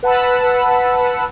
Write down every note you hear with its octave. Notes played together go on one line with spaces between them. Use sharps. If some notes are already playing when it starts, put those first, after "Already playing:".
B4 F#5 A5 B5 E6